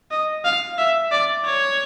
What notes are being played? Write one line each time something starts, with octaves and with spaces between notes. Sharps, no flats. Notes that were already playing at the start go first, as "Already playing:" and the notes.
D#5
F5
E5
D5
C#5